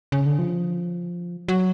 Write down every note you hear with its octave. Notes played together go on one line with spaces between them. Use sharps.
C#3
D3
F3
F#3